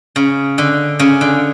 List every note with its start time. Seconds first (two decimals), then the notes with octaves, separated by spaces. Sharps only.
0.16 C#3
0.58 D3
0.99 C#3
1.21 D3